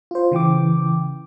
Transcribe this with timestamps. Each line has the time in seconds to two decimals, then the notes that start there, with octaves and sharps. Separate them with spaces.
0.11 F4 C5
0.31 C#3 E3 G5 D6